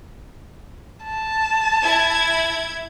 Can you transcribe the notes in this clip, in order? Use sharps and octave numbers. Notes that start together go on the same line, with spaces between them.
A5
E4 G#6